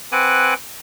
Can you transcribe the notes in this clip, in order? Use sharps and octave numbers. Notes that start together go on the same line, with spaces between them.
C4 B4 F#5 G#5 D6 F#6